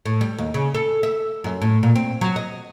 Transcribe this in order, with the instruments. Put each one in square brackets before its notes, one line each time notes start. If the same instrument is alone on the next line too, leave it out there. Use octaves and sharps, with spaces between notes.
[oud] A2
G3
D#2
C#3
A4
E5
F#2
A2
A#2
C4
F#3
D#5